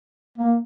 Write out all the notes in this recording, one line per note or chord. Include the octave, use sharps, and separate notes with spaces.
A#3